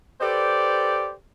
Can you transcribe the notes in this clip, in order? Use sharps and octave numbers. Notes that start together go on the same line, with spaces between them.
G4 A4 B4 C5 D5